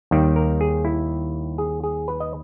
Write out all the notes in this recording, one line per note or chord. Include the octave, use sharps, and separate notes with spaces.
D#2 D#3 G3
A#4
G#4
E4
G#4
G#4
B4
D#5